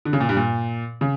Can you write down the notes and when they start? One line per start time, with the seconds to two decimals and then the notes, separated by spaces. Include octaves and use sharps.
0.05 D3
0.13 C#3
0.20 A#2
0.29 G2
0.37 A#2
1.01 C#3